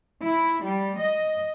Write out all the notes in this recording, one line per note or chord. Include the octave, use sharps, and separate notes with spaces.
E4
G3
D#5